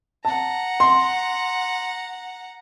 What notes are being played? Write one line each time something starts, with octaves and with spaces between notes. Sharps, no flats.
F#5 A5 A#5
C6